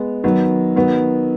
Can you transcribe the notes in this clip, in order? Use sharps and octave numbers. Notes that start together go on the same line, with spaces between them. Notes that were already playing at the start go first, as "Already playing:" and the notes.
Already playing: G#3 B3
D#3 F#3 B3
D#3 F#3 B3